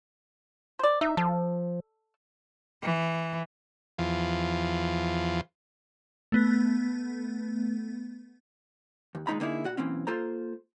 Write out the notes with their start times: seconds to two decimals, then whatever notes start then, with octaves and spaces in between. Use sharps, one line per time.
0.79 C5 D5
1.01 D#4 E5
1.17 F3 A4
2.82 E3
3.98 E2 F3
6.32 A3 B3
9.15 D#2
9.27 D#2 A#2 G#3 D#4 A#5 B5
9.40 D3 A#3 D#4 E4 G#4
9.64 A#2 F#4 F#5
9.77 B1 E3 A#3 C4 C#4
10.07 A#3 F4 A4 C5 A#5